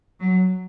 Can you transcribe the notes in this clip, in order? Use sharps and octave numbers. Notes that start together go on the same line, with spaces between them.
F#3